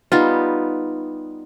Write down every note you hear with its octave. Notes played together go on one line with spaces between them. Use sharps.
G3 B3 D#4 F4